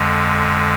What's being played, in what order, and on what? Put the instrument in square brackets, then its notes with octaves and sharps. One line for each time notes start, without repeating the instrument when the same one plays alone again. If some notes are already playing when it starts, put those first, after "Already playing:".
Already playing: [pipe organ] F2 D3 G#3